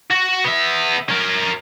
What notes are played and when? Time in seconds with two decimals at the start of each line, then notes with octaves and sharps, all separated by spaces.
0.10 F#4
0.44 B3 E5
1.09 C#4 A#4